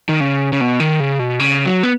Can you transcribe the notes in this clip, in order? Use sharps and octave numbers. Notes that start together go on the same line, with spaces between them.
D#3
C#3
C#3
B2
D#3
C#3
B2
C#3
F#3
B3